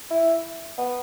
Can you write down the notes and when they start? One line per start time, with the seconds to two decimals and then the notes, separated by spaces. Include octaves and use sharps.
0.11 E4
0.78 B3